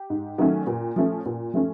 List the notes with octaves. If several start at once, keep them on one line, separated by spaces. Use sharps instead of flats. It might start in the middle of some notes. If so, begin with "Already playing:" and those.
Already playing: G4
G#2
D#3 F#3 A3 C#4
A#2
F3 A3 C#4
A#2
F3 A3 C#4